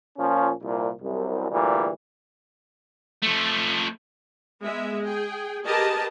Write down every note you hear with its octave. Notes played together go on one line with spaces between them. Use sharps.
A#2 F3 C#4
C2 A#2
C2 F#2
D2 A#2 E3 G3
F3 A3
G#3 B3 E5
G#4 G5
G4 G#4 A#4 B4 D#5 A5